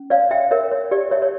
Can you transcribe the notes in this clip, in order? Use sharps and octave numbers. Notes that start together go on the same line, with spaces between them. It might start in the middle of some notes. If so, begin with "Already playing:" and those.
Already playing: C#4
C#5 D5 F5
E5 G5
A#4 C#5 E5
C#5
G4 D5
C#5 E5
C#5